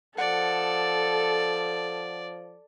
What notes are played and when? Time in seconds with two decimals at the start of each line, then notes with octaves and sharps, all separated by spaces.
0.18 F3 A4 D5 F#5